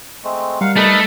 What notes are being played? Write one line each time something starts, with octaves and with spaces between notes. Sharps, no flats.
G#3 A3 C4
G3 A#4 F5 F#5
A3 D#4 A4 B4